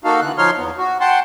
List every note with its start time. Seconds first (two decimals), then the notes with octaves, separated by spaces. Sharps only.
0.04 A#3 D#4 F#4 A4 F5
0.21 D3 E3 F#6
0.38 F3 D#4 C#5 C6 F6
0.58 E2 B3
0.78 F#4
1.01 F#5 G5 A5 C6